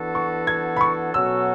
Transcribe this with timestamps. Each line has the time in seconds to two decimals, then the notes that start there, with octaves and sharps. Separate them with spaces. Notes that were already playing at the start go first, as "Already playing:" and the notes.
Already playing: E3 B3 D4 F#4 A4
0.15 C#6
0.47 G#6
0.76 B5
0.81 C#6
1.14 B2 F#3 C#4 F#4 A4 E6